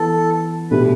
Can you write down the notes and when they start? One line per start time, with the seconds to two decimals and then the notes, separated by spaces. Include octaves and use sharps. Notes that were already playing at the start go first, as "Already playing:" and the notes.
Already playing: E3 B3 A4
0.71 B2 A3 D4 G4 B4